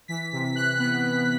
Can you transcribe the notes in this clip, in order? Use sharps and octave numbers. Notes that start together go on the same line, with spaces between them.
E3 B6
C3
C3 F#6
B3 F#6